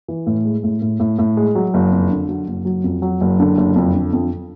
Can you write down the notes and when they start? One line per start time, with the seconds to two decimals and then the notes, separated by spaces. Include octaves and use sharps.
0.08 E3
0.27 A2
0.45 G#3
0.63 A2
0.82 A2
1.00 A2
1.19 A2
1.37 G#3
1.55 F#3
1.74 F#1
1.92 F2
2.10 D3
2.29 F#3
2.48 F#1
2.65 F#3
2.84 F2
3.02 F#3
3.21 F#1
3.40 D3
3.57 F#1
3.76 F2
3.94 D3
4.13 F2